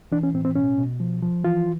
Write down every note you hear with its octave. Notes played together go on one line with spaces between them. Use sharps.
E3 D4
C#4
A2 C4
C4
B2 C#4
B2
F3
F3
E3 F4